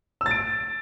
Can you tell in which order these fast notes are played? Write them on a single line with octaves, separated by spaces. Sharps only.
E6 A6 D7